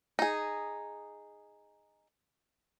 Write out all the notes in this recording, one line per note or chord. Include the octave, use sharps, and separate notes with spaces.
D#4 G#4